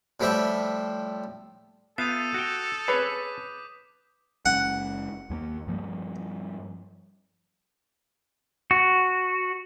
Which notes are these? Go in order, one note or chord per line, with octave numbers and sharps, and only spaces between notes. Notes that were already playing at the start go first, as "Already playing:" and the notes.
A2 F3 G3 E5 G5
B3 F4 A4 E5 D#6 G6 D#7
F#4 G5
G#4 B4 C#5 D6 B6
F#1 G#3 C#4 F#5
D#2 G#3 A#3
G2 F3 G3
F#4